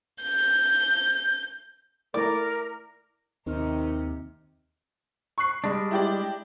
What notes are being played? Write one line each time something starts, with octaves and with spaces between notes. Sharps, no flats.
G6
A3 E4 A#4 D5 D6
D#2 C3 D#3 C4 D#4 F6
C#6 F#6 C7
G3 G#3 D4
E4 G4 D5